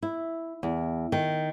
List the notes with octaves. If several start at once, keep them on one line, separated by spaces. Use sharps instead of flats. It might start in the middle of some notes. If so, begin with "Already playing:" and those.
E4
E2
D#3